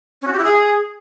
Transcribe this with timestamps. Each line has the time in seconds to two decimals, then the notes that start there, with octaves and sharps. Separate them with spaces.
0.22 C#4
0.27 F#4
0.33 G4
0.39 E4
0.44 G#4